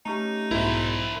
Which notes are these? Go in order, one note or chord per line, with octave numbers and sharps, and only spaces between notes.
A3 C#4 D#4 G4
B1 G#2 E4 A#4 C5